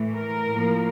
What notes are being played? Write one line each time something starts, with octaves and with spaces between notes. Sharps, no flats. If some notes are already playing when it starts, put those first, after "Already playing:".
Already playing: A2 E3 A3
A#4
A2 F3 A#3